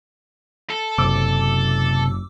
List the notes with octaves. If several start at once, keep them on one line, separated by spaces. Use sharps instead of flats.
A4
F#1 C3 D6 E6